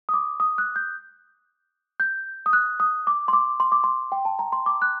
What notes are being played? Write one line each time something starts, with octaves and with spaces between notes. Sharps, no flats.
D#6
D6
D#6
F#6
G6
G6
D#6
F#6
D#6
D6
C6
D6
C6
D6
C6
G5
A5
A#5
C6
D6
F#6